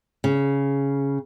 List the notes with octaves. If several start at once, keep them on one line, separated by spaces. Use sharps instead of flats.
C#3